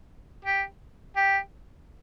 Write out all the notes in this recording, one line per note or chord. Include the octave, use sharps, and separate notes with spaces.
G4
G4